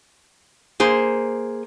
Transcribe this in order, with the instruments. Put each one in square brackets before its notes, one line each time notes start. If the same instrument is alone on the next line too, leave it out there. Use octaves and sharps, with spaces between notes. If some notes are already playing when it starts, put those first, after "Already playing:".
[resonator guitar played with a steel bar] A#3 G#4 C5